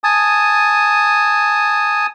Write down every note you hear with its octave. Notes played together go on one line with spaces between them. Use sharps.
G#5 A5 D#6